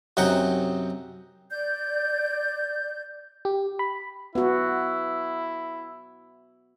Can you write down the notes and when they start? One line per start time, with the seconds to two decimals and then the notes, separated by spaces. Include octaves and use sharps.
0.17 F#2 C3 D#4 F#5 G5
1.51 D5 G6
3.45 G4
3.79 B5
4.35 B3 E4 F#4